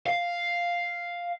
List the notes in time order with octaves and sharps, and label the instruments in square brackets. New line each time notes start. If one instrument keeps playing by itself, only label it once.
[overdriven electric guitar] F5